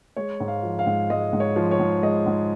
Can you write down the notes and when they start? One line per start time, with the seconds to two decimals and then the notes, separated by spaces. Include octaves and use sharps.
0.16 G#3 C#5
0.40 G#2
0.48 F5
0.63 F3
0.79 F5
0.86 G#2
1.10 G#3 D#5
1.33 G#2
1.40 C#5
1.56 F3
1.71 C#5
1.79 G#2
2.02 G#3 D#5
2.26 G#2